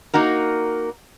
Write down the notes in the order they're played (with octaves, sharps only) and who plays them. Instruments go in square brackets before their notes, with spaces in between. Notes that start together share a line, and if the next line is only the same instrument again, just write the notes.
[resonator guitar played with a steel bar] A#3 D#4 F#4 A#4